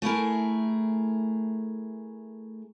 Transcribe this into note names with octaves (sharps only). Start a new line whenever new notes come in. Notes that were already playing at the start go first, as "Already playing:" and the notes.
A3 E4 G#4 A#4